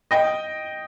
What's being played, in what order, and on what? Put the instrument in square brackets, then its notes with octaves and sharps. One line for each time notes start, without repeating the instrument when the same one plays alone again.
[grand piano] D#5 G5